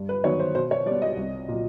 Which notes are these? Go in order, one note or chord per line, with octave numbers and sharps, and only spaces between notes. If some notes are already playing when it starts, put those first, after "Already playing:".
Already playing: G2
B4
D#3 F#3 B3 D#4 C#5
C5
B2 C5
C#5
G3 B3 D5
D#5
C2
A#2 F#3